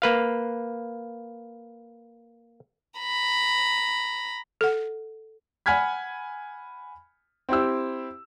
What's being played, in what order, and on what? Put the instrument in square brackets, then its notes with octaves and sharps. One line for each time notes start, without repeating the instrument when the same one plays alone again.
[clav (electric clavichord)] A#3 B4 F5
[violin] A#5 B5
[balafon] A4 F#5
[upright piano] F#5 G#5 B5 F6 G#6 B6
C4 E4 G4 E6